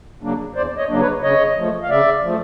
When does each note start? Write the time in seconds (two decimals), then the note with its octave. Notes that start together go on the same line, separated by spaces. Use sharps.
0.22 C#3 F#3 A#3 D4
0.55 E2 C5 D5
0.78 C#5 D#5
0.88 C#3 F#3 A#3 D4
1.00 B4 C#5
1.22 C#3 C#5 D#5
1.57 F3 A3
1.83 F5
1.89 C#3 D5 E5
2.23 F3 A3